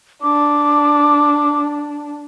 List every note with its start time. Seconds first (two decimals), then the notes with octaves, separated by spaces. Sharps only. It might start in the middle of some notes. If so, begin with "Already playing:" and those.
0.22 D4 D6